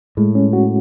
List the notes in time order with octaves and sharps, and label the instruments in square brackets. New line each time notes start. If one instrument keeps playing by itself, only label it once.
[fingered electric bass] A2 [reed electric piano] G#3
[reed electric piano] C#4
F#4